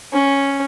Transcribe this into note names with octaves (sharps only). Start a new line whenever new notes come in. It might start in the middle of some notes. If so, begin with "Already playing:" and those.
C#4